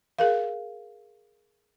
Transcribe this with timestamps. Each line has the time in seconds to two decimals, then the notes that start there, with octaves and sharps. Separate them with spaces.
0.19 G#4 A#4 F5